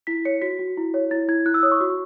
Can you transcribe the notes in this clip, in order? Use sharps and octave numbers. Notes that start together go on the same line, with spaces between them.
E4 B6
C#5 C#7
F#4 B6
F#4
E4
C#5
E4 A6
E4 G#6
E4 F#6
E6
C#5 D#6
C#6
F#4